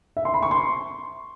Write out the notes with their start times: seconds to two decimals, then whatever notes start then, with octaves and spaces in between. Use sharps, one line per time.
0.17 E5
0.25 C6
0.34 B5
0.43 C#6
0.51 C6